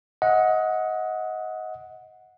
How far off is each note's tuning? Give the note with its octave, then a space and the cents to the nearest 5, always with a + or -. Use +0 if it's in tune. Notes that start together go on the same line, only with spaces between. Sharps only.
D#5 +25 F#5 -10